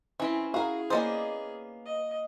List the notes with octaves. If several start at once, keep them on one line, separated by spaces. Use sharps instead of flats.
E3 C4 C#4 E4
F#4 G#4 A#4 F5
A#3 B3 C#4 C5 D5 D#5
D#5